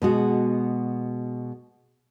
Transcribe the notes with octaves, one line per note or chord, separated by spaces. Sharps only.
B2 G#3 F#4